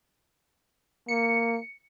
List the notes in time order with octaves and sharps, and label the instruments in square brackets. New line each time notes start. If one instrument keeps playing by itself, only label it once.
[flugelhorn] A#3 [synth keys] C#7